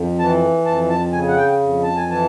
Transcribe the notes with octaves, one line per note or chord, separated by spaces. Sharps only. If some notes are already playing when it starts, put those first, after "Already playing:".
Already playing: F2
E3 A5
F2 A5
A5
C#3 G#5
F#5
G5
F2
A5
G#5
E3 A5